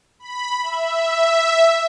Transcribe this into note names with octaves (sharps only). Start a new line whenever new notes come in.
B5
E5